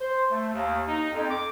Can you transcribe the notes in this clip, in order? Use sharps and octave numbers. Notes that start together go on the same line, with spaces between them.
C5
A3
D#2
D#4
F2
D6